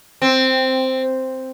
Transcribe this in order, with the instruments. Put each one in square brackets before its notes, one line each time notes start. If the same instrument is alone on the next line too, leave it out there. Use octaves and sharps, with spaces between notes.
[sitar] C4